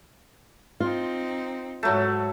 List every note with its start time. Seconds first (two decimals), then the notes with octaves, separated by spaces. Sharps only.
0.80 C4 D#4 F4
1.83 G#2 F#3 A3